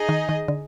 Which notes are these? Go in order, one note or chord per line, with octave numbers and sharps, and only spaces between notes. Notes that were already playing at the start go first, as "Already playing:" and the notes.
Already playing: D#4 G#4 D#5
D#3
D#3
D3